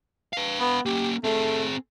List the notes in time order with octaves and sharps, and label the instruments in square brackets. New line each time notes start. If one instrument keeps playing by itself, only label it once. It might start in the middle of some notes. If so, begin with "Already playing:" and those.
[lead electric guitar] B4 F5
[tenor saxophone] B3
[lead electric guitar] A#3 C#4 [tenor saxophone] G4
[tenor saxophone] A3 [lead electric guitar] C4 G#4